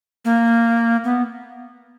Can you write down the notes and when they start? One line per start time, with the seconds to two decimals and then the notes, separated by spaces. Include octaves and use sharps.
0.25 A#3
1.04 B3